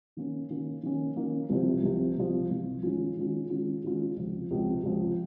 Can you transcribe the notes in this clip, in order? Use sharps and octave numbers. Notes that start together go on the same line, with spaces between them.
D#3 A#3 C#4
D#3 A#3 C#4
D#3 A#3 C#4
D#3 A#3 C#4
C2 C3 F3
C2 C3 F3
C2 C3 F3
C2 C3 F3
D#3 G#3 C#4 F4
D#3 G#3 C#4 F4
D#3 G#3 C#4 F4
D#3 G#3 C#4 F4
C#2 C3 F3
C#2 C3 F3
C#2 C3 F3